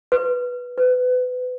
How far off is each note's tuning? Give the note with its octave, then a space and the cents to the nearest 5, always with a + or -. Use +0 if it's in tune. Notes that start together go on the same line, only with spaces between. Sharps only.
B4 -5
B4 +25